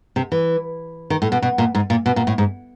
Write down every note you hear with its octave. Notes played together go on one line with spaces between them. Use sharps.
C3
E3
D#3
A2
B2
B2
A#2
G#2
A#2
B2
A#2
A2
G#2